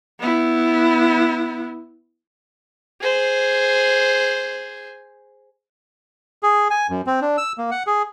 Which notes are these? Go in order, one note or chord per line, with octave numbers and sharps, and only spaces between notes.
B3 E4
G#4 C5
G#4
G#5
F#2
C4
D4
E6
A#3
F#5
G#4